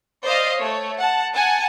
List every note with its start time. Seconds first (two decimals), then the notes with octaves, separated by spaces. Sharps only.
0.25 C5 D5 D#5 F5
0.59 A3 C#5
0.98 F#5 A5
1.34 F#5 G#5 A5